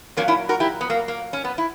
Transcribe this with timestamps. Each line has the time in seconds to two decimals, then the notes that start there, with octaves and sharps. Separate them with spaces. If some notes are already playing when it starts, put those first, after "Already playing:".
0.17 A#2 F#3 A#3 C#4
0.28 C#4 E4
0.49 F#4 A#4
0.60 E4 G4
0.81 B3
0.90 A#3
1.08 A#3
1.33 C#4
1.44 B3
1.58 E4